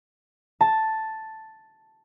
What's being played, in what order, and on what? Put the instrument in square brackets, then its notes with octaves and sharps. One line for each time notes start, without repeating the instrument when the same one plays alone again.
[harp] A5